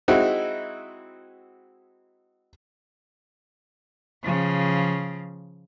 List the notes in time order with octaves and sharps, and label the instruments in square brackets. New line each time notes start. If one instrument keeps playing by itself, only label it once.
[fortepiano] G#3 C4 D#4 E4 F#4
[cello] C#3 F3